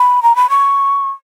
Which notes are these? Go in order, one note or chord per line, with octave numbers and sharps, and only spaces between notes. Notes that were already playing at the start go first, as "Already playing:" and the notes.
Already playing: B5
A#5
B5
C#6